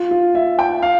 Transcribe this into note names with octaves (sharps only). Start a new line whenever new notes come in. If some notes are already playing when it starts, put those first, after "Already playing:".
Already playing: F4
F4
E5
G5
F5